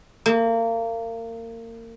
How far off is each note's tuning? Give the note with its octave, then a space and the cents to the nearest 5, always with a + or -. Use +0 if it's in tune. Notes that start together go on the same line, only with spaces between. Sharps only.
A#3 -30